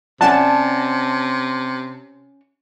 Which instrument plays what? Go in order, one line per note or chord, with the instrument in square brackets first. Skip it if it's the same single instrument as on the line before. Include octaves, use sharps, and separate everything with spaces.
[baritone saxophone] C3 [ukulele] C#4 D5 F#5 [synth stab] A5